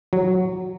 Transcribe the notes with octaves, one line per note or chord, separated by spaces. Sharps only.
F#3